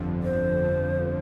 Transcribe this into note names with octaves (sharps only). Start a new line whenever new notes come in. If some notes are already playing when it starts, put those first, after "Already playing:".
Already playing: G1 F2 D3 F3
C5
G1 F2 D3 F3